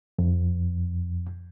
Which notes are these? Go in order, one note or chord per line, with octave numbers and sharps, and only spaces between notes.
F2